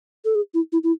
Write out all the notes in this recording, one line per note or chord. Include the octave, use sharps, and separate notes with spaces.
A4
G#4
E4
E4
E4